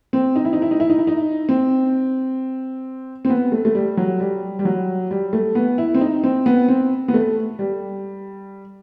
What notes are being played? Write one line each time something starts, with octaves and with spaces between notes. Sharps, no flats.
C4
D#4
E4
D#4
E4
D#4
E4
D#4
E4
D#4
C4
C4
B3
A3
A3
G3
F#3
G3
G3
F#3
G3
A3
B3
E4
C4
D#4
C4
B3
C4
B3
A3
G3